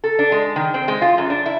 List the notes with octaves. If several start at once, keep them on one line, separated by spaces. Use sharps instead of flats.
A4
D4
G#3
D#3
C4
G#3
F4
F#2
D4
E4